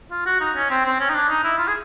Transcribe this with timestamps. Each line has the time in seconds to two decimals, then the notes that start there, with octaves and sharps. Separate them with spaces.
0.11 F4
0.26 F#4
0.40 D#4
0.56 C#4
0.71 C4
0.86 C4
1.00 C#4
1.09 D#4
1.14 D4
1.29 D#4
1.44 E4
1.58 F4
1.68 G#4